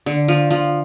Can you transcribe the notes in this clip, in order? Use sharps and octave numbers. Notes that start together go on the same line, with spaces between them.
D3
F3
F3